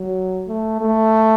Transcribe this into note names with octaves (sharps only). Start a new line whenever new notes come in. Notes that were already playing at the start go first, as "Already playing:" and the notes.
Already playing: F#3
A3
A3